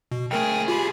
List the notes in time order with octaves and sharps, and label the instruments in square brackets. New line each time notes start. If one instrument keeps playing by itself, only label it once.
[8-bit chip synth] B2
[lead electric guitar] B1 G#4 [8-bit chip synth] A3 A#4 G5
[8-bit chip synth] F4 G4 B5